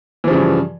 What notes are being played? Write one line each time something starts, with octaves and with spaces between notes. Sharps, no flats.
G2 C#3 E3 F3